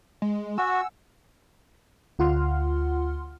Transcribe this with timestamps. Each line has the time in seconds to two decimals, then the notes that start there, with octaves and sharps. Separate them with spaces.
0.22 G#3
0.58 F#4 F#5 G#5 E6
2.19 D2 F4 F#5 C6 F6